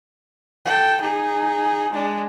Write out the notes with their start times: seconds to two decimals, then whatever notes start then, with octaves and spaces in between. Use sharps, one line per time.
0.65 A4 G5
1.01 D#4 G#4
1.92 G#3 D4